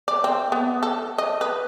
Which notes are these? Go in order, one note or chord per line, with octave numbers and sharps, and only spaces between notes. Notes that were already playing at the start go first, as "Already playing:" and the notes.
D5
C4
B3
A4
D#5
B4